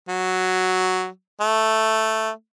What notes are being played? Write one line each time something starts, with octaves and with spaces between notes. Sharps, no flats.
F#3
A3